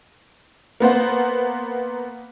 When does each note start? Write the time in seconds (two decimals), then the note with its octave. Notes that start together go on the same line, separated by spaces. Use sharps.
0.80 A#3 B3 C5 F#5